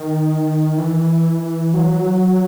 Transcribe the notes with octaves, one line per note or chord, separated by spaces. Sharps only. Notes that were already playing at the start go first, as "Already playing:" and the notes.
Already playing: D#3
E3
F#3